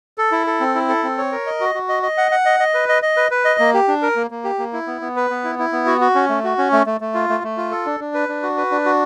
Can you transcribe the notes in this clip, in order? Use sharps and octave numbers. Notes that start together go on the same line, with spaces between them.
A4
E4
A4
C4
E4
A4
C4
C#5
A#4
D#5
F#4
F#4
D#5
D#5
F#5
F#5
D#5
D#5
B4
D#5
D#5
B4
B4
D#5
A#3
G4
D4
A#4
A#3
A#3
G4
A#3
E4
B3
B3
B4
B3
E4
E4
B3
F#4
F#4
C#4
A3
F#4
C#4
A3
A3
A3
F4
A3
A3
F4
A4
D4
D4
B4
D4
F#4
B4
D4
F#4